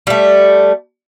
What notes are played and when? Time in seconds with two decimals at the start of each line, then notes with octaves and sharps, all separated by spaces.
0.07 G3 A3